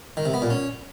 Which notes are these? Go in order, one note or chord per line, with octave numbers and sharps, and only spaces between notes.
D#3
C3
B3
A#2
C#4